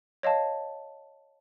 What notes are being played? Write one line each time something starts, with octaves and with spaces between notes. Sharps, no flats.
C#5 D#5 F5 A5